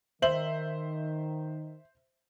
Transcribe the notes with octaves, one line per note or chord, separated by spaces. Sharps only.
D#3 C5 E5 F#7